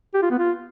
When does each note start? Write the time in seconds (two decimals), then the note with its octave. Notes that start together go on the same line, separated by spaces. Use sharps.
0.14 G4
0.22 F4
0.31 B3
0.39 F4